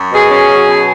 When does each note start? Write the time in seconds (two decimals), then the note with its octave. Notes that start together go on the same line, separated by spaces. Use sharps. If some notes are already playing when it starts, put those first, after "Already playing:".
Already playing: F#2
0.11 B2 G#4
0.31 C#4
0.49 F#3
0.68 B2